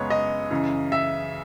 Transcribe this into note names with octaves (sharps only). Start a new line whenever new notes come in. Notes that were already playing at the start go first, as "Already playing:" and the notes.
Already playing: F#2 C#3 G#3 B3 C#5
D#5
F#2 C#3 E3
E5